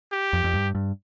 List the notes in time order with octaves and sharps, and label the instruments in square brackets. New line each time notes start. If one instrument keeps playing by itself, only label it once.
[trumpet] G4
[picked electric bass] F2
F2
G2
G2